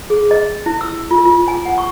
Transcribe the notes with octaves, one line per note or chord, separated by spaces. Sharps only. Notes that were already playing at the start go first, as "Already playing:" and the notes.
G#4
D#5
E4
E6
F4
F4
G#5
F#5
C#6